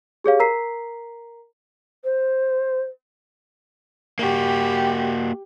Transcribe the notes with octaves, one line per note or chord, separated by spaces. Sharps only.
G4 G#4 C#5 F5
A#4 A#5 B6 C7
C5
A#3 F#4 G4